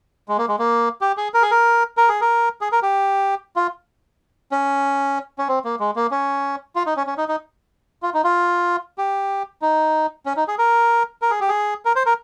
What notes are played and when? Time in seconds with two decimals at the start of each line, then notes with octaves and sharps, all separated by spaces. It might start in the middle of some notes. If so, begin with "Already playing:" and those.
0.28 G#3
0.38 A#3
0.48 G#3
0.59 A#3
1.01 G4
1.17 G#4
1.34 A#4
1.42 G#4
1.51 A#4
1.97 A#4
2.09 G#4
2.21 A#4
2.61 G#4
2.72 A#4
2.83 G4
3.56 F4
4.52 C#4
5.38 C#4
5.48 C4
5.64 A#3
5.80 G#3
5.96 A#3
6.11 C#4
6.76 F4
6.86 D#4
6.96 C#4
7.07 C#4
7.18 D#4
7.28 D#4
8.02 F4
8.14 D#4
8.24 F4
8.98 G4
9.62 D#4
10.26 C#4
10.36 D#4
10.48 G#4
10.58 A#4
11.22 A#4
11.31 G#4
11.41 G4
11.49 G#4
11.85 A#4
11.96 C5
12.06 A#4